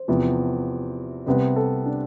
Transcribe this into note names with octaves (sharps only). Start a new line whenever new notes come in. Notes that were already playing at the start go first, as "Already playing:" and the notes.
Already playing: C5
E2 C3 F3 B3
C2 C3 G3 B3 B4
A4
D4